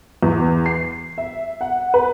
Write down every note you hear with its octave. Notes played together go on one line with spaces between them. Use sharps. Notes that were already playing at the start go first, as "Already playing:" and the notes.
E2
C7
E5
F#5
B4